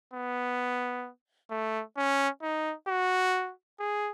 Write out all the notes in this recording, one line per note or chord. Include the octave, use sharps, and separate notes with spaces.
B3
A3
C#4
D#4
F#4
G#4